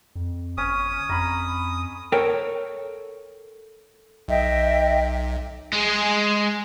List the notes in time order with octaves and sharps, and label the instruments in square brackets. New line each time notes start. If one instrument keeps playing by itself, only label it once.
[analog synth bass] F2
[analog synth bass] G1 [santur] C#4 [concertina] D#6
[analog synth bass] F2 [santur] A#5 B5
[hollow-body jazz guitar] A4 A#4 C#5 G5
[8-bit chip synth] B1 [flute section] D#5 E5 G5
[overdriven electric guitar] G#3 G#4